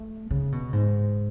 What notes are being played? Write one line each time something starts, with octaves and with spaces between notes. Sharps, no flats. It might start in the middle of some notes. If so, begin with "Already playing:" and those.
Already playing: A3
C#3
B2
G#2